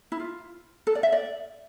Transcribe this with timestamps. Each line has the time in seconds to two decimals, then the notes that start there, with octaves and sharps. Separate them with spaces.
0.12 E4
0.20 F4
0.87 A4
0.95 D5
1.03 E5
1.12 D5